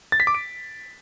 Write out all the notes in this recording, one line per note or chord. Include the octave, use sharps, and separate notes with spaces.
A6
B6
D6
D7